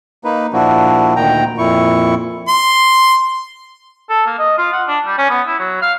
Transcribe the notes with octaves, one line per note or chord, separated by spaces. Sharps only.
A#3 D#4 B4
A#2 F3 D4 E4 F#4
D2 A#2 D#3 G5 A#5
F2 A#2 E4 C#6
C6
A4
A#3
D#5
F4
F#5
D4
G3
C#4
B3
E4
F#3
F5